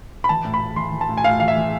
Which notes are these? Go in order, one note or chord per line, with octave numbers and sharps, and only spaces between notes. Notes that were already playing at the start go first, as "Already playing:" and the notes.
B5
E3 A5
A2
B5
A2
E3 C6
E3
A5
A2
G#5
A2 F5
E3 F5
E5
E3